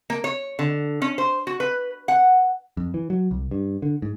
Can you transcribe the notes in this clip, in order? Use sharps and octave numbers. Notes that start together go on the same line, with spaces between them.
A#3
C#5
D3
C#4
C5
F#4
B4
F#5
F2
E3
F#3
C2
G2
D3
G#2